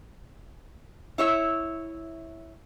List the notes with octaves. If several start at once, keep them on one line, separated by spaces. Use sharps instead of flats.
E4 C#5 E5